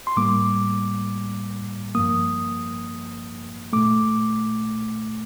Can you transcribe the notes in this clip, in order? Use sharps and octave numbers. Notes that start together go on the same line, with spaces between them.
C6
A2 G3 A#3 D6
G2 F3 A#3 D#6
A#2 A3 D6